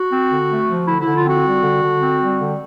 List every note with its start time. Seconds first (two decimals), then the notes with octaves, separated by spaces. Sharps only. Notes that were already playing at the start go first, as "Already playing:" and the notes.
Already playing: F#4
0.12 C4
0.31 D3
0.50 A3
0.69 F3
0.87 D3 E4
1.01 D3 E4
1.16 F4
1.25 C4 F#4
1.45 G3
1.63 D3
1.82 D3
2.01 C4
2.20 G3
2.39 D3